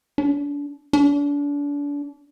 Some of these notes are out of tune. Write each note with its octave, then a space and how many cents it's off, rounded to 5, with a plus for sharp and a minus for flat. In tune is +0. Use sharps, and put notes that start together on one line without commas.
D4 -35
D4 -35